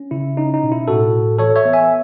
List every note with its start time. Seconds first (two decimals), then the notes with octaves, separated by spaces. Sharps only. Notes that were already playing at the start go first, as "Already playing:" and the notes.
Already playing: C#4
0.11 C#3 E4
0.37 C#4 D#4
0.54 D#4
0.63 B2
0.72 E4
0.88 A2 F#4 A4
1.13 A2
1.39 E3 A4 C#5
1.56 C#5 E5
1.65 B3
1.73 E5 G#5